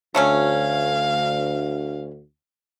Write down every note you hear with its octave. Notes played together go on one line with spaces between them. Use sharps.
D2 F#3 A3 C#4 F5